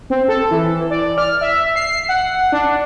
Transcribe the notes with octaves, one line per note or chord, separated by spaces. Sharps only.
C4
A4
E3
D5
F6
E5
C7
F#5
D4